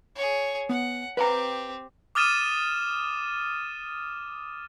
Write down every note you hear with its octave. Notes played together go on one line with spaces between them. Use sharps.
G#4 C#5
B3 F#5
C4 G4 B4 F5 A#5
D6 D#6 F6 A6 D#7 E7